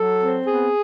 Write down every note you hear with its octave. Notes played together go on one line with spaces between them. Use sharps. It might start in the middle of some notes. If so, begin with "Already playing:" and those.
Already playing: F#3 A4
C4
B3 G#4